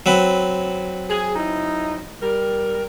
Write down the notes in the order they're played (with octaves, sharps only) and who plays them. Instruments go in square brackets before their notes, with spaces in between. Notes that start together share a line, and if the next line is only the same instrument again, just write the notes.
[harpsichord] F#3 C4 B4
[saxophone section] G#4
D#4 E4
G3 A#4